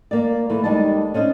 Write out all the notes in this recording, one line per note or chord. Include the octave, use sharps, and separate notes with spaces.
A#3 D5
E3 A3
D#2 G3 G#3 D5 A5
C#4 D4 C5 D#5